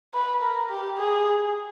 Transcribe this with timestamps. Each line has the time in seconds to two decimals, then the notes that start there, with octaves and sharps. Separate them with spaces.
0.14 B4
0.42 A#4
0.70 G4
0.98 G#4